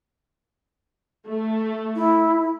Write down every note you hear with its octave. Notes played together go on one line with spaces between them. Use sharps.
A3
E4